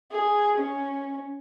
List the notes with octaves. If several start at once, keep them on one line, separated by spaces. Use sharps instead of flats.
G#4
C#4